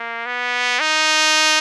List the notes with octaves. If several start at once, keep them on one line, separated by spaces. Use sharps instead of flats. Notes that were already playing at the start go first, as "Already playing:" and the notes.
Already playing: A#3
B3
D#4